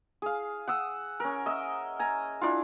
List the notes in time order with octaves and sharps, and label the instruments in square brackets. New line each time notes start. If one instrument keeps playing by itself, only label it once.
[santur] G#4 F5
F#5 D#6 E6
C#4 A#4
D#5 E5
G#5 A#5
D4 E4 F4